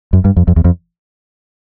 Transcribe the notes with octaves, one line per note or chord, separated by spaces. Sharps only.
F#2
G2
F2
F2
E2
F2